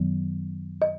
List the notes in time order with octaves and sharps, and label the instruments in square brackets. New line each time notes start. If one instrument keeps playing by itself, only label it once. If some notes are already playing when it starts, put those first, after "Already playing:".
Already playing: [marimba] F#2 D#3 F#3 B3
D#5